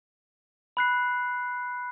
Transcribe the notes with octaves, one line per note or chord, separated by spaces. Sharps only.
B5 F#6 C7